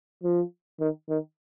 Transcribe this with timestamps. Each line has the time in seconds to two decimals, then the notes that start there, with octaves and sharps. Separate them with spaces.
0.24 F3
0.80 D#3
1.09 D#3